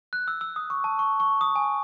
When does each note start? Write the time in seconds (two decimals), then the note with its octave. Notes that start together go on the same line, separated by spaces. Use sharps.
0.13 F#6
0.28 E6
0.41 E6
0.56 D#6
0.70 C#6
0.84 A5
0.99 C#6
1.20 C#6
1.41 D#6
1.56 G#5